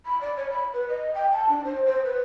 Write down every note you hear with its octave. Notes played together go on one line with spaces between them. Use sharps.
B5
D5
C#5
B5
B4
D#5
G5
A5
D4
C5
C5
B4